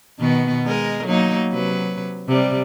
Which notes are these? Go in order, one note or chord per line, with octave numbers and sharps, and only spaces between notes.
B2 D#3 B3
G#3 A#4 D#5
F#3 A#3 D#4
C3 F#3 B4
C3 G3